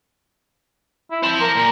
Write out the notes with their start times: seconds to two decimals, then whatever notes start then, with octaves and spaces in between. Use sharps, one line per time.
1.11 E4
1.23 C4 C5 A5
1.41 A#4
1.56 A#2